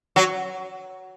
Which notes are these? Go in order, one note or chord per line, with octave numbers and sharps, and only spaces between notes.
F#3